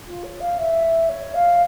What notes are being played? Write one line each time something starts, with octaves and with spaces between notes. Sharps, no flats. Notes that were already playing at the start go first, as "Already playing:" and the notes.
F4
C#5
F5
E5
C#5
F5